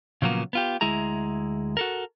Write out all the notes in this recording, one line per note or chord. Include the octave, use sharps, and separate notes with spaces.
A#2 C#3 F3 F#3 A#3 B3
B3 F4 G4
D2 G#3 E4 G#4 A#5
F#4 A4 A#4